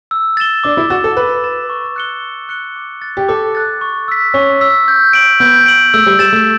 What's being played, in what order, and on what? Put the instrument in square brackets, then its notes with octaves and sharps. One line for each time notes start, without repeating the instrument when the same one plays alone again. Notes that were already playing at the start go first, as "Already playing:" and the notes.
[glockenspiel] E6
A6 E7 G7
[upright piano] D4 [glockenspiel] D6
[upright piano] E4
[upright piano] F#4 [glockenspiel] A6 E7
[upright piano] A4
[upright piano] B4 [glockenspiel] D6
[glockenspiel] A6 E7
C#6
F#6 C#7 G7
C#6
F#6 C#7 G7
D6
F#6 A6
[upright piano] G4
[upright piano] A4 [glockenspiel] D6
[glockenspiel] F#6 A6
C#6
E6 B6
[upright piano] C#4 [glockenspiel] C#6
[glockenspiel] E6 B6
G6
D7 F#7
[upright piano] B3 [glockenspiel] G6
[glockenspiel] D7 F#7
[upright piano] A3 [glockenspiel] E6
[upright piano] G3
[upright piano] G3 [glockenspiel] A6 E7
[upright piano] A3